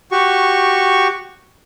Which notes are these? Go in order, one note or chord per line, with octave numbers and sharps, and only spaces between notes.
F#4 G4 C#6